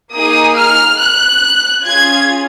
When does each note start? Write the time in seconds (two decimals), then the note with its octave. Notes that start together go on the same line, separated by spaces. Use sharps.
0.13 A#3 D#4 G#4 D#6
0.56 F6
0.99 F#6
1.85 C#4 F4 G#4 G#6